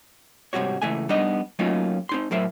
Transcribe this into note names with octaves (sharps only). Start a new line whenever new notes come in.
G#2 C3 F#3 G3 F#4 C#5
C#2 E3 A3 G#5
G3 B3 D4 D#4 D#5
F#3 A3 A#3 C#4 D#4 F4
C4 D#4 C6
A2 F#3 A#4 C5 E5